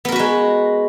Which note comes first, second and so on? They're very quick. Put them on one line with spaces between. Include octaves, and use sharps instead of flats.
B3 A#4 F#4 B4 G#3